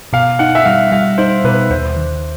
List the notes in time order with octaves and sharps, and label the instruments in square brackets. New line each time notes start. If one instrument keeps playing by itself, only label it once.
[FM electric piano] B2 [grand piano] F5
[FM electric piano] D#4 [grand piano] F#5
[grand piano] E5
[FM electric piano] G3 [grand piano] F5
[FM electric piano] G3 [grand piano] F5
[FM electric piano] D#4 [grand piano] C5
[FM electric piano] B2 [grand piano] B4
[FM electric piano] D#2 [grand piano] C5
[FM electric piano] D#3